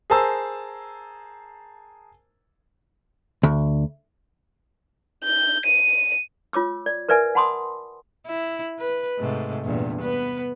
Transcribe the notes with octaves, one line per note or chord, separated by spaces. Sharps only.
G#4 A#4 C5 A5 A#5 E6
D2
G6
D#7
F4 C#5 D6 E6
D5
A#4 B4 D5 E5 G#5
F#5 A5 B5 C6 D6 D#6
E4
B4
G#2 C3 A3
E2 G2 A#2
B3 B4